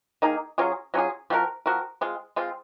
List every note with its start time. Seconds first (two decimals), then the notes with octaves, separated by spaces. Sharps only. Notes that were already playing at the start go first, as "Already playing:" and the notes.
0.22 D#3 A#3 D#4 G#4
0.58 F#3 C#4 F4 G#4
0.94 F#3 C#4 F4 G#4
1.30 F3 C4 F#4 A#4
1.66 F3 C4 F#4 A#4
2.01 G#3 C4 F4
2.36 G#3 C4 F4